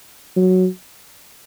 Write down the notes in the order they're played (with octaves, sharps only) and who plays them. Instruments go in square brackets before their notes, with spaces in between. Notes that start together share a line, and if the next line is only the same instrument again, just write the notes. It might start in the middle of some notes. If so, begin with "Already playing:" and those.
[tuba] F#3